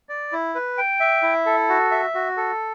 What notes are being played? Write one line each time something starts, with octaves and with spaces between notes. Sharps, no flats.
D5
E4
B4
G5
E5
E4
A4
F#4
E5
F#4
A4